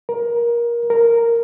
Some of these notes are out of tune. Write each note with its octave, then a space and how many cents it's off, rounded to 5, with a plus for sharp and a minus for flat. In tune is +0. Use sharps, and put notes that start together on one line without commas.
A#4 +20
A#4 -5